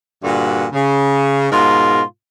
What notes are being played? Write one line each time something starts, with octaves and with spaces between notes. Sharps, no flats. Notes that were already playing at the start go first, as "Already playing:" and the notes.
G2 A#2 D3 F#4
C#3
G#2 B2 F4 A#4